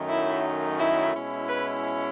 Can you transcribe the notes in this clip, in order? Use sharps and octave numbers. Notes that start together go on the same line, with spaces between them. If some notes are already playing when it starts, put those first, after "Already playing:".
Already playing: F#2 D#3 F#3 A3 D#4
E4
E4
B2 G#3 C#4 E4
B4